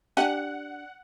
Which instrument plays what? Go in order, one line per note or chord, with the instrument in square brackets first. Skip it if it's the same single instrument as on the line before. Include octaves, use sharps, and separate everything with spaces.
[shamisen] D4 G4 G#5 [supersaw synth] F#5